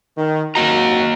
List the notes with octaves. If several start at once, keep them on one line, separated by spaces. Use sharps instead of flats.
D#3
G#1 F#2 A#3 F#4 D#5 A#5